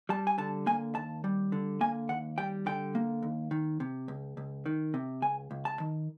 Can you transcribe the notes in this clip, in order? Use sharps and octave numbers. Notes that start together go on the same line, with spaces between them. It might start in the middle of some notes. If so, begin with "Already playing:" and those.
G3 A5
G#5
D3 A5
A#3 G#5
D#2 A5
G3
D3
A#3 G#5
D#2 F#5
G3 G5
D3 G5
A#3
D#2
D#3
C3
C#2
C#2
D#3
C3
C#2 G#5
C#2
A5
D#3